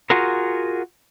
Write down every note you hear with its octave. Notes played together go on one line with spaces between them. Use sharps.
F4 F#4 G#4 A#4